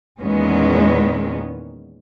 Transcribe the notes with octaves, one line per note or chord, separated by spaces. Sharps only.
E2 A#2 D#3 G#3 B3 C#4